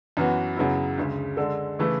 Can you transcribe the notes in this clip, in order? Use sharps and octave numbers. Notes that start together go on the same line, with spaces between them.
F#2 E3 B3 F#4
F#2 C#3 F#3 B3 E4
D2 C#3 G#3
D3 G#3 D4 A4
C#3 E3 A3 E4